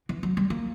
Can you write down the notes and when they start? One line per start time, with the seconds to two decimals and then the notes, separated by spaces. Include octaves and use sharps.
0.09 E3
0.23 F#3
0.37 G3
0.50 A#3